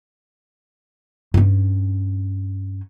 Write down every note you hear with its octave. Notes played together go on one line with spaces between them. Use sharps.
G2 C#4